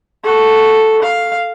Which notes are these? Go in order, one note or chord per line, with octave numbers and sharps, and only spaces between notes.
F#4 A4
F5